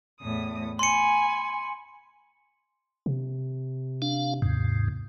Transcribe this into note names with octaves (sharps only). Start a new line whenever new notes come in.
E2 A2 D#6
G#5 B5 C6 C#7
C3
D4 F5
D#2 G#2 C3